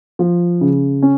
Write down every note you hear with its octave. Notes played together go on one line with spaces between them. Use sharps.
F3
C#3
C#4